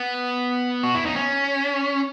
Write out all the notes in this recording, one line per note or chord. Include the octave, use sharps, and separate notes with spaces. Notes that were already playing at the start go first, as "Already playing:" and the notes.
Already playing: B3
F#4
E4
D#4
C#4